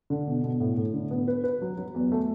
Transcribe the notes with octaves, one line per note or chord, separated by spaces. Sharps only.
D3
B2
B2
A2
A2
D3
B3
B4
B4
F#3
F#3
E2
A3